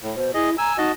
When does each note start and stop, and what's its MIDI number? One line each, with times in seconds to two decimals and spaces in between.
0.02 0.15 45
0.16 0.31 47
0.16 0.33 72
0.34 0.55 64
0.34 0.50 68
0.34 0.50 75
0.58 0.77 80
0.58 0.72 82
0.58 0.77 88
0.78 0.90 63
0.78 0.92 66
0.78 0.92 75
0.78 0.92 81